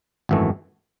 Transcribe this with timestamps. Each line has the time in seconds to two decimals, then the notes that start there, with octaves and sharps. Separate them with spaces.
0.29 G#1 F#2 E3 A3